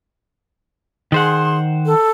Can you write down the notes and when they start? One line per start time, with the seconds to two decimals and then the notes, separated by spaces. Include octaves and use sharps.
1.12 D#3 G#4 C5 F#5 C6
1.86 A4